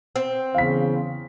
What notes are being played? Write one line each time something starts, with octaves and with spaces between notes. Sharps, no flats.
C4
E2 C#3 F5 B6